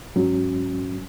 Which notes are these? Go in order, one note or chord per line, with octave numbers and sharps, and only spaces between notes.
G#2 F#3 C#4